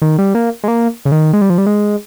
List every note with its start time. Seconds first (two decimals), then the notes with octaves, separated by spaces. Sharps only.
0.02 D#3
0.18 G3
0.35 A#3
0.64 G#3
0.68 A#3
1.05 C#3
1.12 D#3
1.33 G#3
1.41 G3
1.50 F3
1.58 G3
1.66 G#3